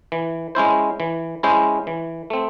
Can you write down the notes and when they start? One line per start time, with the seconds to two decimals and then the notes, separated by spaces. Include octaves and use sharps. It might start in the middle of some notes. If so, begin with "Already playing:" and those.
0.12 E3
0.55 G#3 C#4 E4 C5
1.00 E3
1.43 G#3 C#4 E4 C5
1.87 E3
2.30 A3 C4